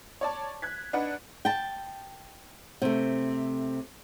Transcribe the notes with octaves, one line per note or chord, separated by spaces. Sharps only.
C#5 D5 A5
F#6 G#6 B6
D4 D#4 B4 F#5
G5 A5
C3 A3